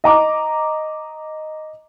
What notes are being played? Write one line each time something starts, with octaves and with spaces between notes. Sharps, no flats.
D#5 A#5 D6